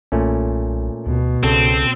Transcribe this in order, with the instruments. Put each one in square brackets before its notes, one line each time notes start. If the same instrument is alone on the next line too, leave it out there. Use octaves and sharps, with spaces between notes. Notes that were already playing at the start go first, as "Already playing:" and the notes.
[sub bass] B1 [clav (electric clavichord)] A#2 A3 C#4
[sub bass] D2 [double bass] B2
[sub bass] C2 [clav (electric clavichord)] C#3 A4 [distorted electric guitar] C4